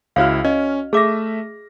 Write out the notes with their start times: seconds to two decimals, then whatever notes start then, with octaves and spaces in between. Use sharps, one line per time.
0.16 C#2 E4 F#4 C#5 F5 F6
0.45 C#4 D#5
0.93 A3 G#4 E5 D6 A#6